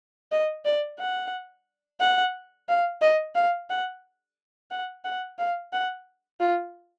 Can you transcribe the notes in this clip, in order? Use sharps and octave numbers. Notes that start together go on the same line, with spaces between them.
D#5
D5
F#5
F#5
F5
D#5
F5
F#5
F#5
F#5
F5
F#5
F4